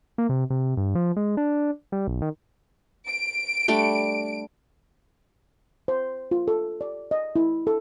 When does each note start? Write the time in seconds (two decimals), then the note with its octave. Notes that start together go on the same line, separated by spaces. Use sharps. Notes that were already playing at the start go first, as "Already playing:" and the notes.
0.18 A#3
0.29 C3
0.50 C3
0.77 G2
0.95 F3
1.16 G#3
1.37 D4
1.92 G3
2.07 B1
2.22 D#3
3.07 D7
3.68 G3 A3 D4
5.88 C5
6.31 F4
6.48 A4
6.81 D5
7.11 D#5
7.36 E4
7.67 A4